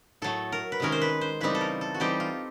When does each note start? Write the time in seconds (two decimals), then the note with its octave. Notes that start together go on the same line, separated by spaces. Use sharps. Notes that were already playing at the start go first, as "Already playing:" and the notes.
0.22 A2 F#3 A3 A4
0.52 A#4
0.72 B4
0.80 C3 D#3 G#3 C#4 A#4
0.92 C5
1.01 B4
1.21 C5
1.41 C#3 E3 G3 C4 D#4 B4
1.55 A4
1.61 A#4
1.81 A4
1.94 F#4
2.00 E3 G3 C4 D#4 G4
2.20 F4